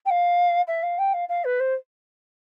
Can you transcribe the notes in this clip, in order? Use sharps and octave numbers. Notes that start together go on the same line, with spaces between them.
G5
F5
E5
F5
G5
F5
F5
B4
C5